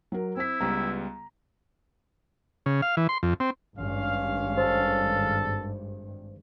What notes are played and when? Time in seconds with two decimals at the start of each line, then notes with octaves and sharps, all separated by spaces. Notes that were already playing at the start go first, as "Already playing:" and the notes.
0.12 F#3 A#4
0.37 C4 E4 B6
0.61 C#2 G3 B3 A#5
2.66 C#3
2.82 F5
2.97 E3
3.09 C6
3.23 F2
3.40 C4
3.78 G#1 G2 C#4 F5
4.58 A4 C5